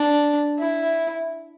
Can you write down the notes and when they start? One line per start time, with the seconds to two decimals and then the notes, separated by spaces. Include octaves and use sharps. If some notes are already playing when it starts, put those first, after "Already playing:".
Already playing: D4
0.58 E4